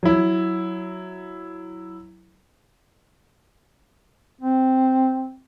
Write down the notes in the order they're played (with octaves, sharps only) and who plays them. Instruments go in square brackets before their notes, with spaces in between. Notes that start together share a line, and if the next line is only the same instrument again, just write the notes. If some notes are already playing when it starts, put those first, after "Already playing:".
[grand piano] F#3 E4
[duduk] C4